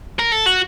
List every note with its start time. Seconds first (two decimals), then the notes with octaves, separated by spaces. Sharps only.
0.19 A#4
0.32 A4
0.46 F#4